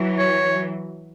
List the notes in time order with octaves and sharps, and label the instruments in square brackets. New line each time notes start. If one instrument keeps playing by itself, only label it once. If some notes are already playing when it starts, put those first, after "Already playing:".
Already playing: [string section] E3 F#3
[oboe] C#5